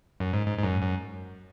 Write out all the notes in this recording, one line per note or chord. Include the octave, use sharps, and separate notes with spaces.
F#2
G#2
G#2
G#2
F#2
F#2